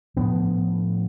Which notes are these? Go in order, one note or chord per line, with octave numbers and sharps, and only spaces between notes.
A2 F3 B3 D4